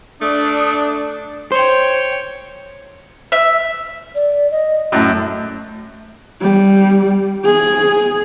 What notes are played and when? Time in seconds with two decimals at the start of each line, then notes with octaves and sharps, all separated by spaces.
0.21 A3 D4 D#6
1.52 C5 C#5 G5
3.32 E5
4.15 D5
4.51 D#5
4.92 F#2 A2 E5
6.42 G3
7.44 G#4